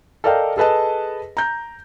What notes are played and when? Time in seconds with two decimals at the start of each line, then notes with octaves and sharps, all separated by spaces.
0.24 A4 A#4 D5 D#5 F5 G5
0.57 G#4 A4 B4 D#5 A5
1.37 A#5 G6